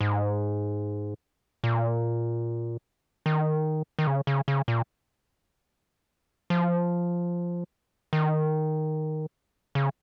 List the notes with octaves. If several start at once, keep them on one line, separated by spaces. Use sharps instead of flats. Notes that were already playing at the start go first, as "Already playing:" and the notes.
G#2
A#2
D#3
D#3
C#3
C#3
C#3
A#2
F3
D#3
C#3